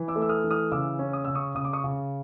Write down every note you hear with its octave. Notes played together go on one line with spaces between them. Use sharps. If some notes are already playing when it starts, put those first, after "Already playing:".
Already playing: E3
D6 E6
A3
E6
D#6 F6
E3
D#6 F6
C#3 D6 E6
C#4
D#6
C#3 E6
C#6 D#6
C#3 D#6
D6
C#6 D#6
C#3